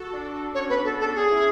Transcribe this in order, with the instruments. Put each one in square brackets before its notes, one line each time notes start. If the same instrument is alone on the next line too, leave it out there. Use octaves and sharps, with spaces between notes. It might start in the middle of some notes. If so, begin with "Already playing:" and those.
Already playing: [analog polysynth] F#4 A4
D4 F#4
F#4 A4
[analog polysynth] C#4 [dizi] C#5
[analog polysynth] B3 [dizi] B4
[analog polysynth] C#4 [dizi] A4
[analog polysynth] B3 D4 [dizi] A4
[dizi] G#4
[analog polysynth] C#4 E4